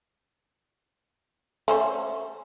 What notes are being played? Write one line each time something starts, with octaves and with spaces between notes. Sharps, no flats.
A3 C#4 C5